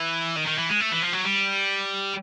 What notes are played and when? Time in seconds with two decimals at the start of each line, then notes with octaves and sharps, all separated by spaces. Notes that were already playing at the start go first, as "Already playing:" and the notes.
Already playing: E3
0.37 D#3
0.47 D#3
0.58 E3
0.69 G#3
0.81 A3
0.91 E3
1.02 F3
1.13 F#3
1.24 G3